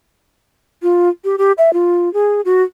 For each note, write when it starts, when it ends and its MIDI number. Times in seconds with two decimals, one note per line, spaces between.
0.83 1.09 65
1.24 1.36 67
1.38 1.52 67
1.58 1.73 76
1.73 2.12 65
2.14 2.41 68
2.45 2.63 66